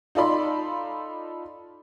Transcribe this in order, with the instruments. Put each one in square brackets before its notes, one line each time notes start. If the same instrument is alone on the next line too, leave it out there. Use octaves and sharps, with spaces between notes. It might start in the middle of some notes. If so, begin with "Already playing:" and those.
[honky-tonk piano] D#4 F4 A4 D5 B5 C6